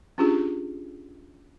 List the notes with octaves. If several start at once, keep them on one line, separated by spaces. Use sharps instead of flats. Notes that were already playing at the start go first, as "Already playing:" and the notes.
C#4 D4 F4 G4 G#4